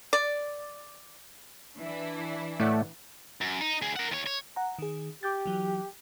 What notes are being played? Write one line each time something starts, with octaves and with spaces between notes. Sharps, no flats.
D5
E3 D4 E4
A2 A3 D5 F#5
F#2
D#4
D2 G#4
A#4 F#5
D#2 C#5
C#5
F#5 A#5
D#3 G#4
G4 D6 G6 A6
E3 F#3